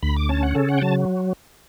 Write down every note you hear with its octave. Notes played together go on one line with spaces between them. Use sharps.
D2 B5
D6
C#4 A5
F#5
C#3 A4
F#5
G5
F#3 A5